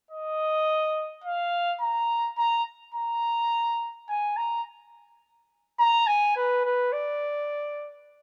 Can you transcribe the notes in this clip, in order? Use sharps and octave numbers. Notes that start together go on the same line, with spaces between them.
D#5
F5
A#5
A#5
A#5
G#5
A#5
A#5
G#5
B4
B4
D5